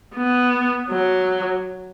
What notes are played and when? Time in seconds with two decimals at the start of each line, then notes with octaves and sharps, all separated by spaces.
0.15 B3
0.89 F#3